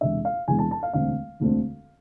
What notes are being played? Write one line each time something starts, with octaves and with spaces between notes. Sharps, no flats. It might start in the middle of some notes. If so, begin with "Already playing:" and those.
E1 E2 C3 G#3 D4 E5
F5
E1 E2 C3 G#3 D4 G#5
A5
A5
F5
E1 D2 D3 A3 C4 F5
E1 D2 D3 A3 C4